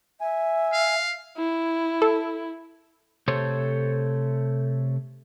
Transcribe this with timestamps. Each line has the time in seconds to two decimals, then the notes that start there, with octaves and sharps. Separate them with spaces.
0.21 E5 G#5
0.73 F5
1.37 E4
2.02 A4
3.28 C3 A3 A4 C5 C#5